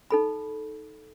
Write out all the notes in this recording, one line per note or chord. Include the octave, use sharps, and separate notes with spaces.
D#4 A4 B5